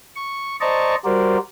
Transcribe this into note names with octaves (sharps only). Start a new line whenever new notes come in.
C#6
C5 D5 D#5 A5 A#5 C#6
G3 F#4 A#4 C5 D5